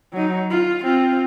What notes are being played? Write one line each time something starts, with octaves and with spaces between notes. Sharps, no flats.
F#3 D#4
F4
C4 F4